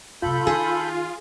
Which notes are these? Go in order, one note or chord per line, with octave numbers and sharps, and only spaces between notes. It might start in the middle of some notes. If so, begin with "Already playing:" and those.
F#2 C3 F4 A4 B5 G6
D#3 G#4